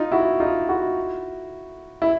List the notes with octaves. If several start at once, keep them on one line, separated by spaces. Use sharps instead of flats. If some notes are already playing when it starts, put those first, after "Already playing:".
Already playing: D#4 F4
E4 F#4
D#4 F4
E4 F#4
E4